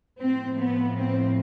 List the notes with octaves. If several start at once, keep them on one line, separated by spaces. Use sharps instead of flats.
A2 F3 C4
B3
C4